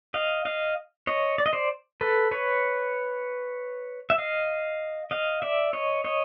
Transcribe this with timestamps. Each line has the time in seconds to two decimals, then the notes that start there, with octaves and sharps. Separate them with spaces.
0.14 D#5 F5
0.45 D#5 F5
1.07 C#5 D#5
1.38 D5
1.46 D#5
1.53 C5 D5
2.01 A4 B4
2.31 B4 C#5
4.10 E5
4.18 D#5 F5
5.11 D#5 F5
5.42 D5 E5
5.73 C#5 D#5
6.04 C#5 D#5